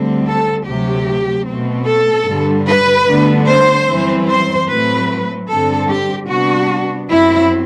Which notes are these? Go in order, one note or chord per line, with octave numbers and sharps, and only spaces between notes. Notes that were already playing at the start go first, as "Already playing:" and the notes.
Already playing: D2 D3 G3 C4
A4
D2 C3 F#3 G4
B2 A3 C4
A4
G2 D3 G3
B4
D2 D3 G3 B3 D4
C5
F#2 E3 G3 C4
C5
A2 F#3 A3 C4 B4
G2 D3 G3 C4 A4
G4
C3 G3 B3 D4 F#4
F#2 F#3 C4 E4